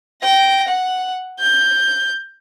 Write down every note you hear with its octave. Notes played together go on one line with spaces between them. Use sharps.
G5 A#6
F#5
G6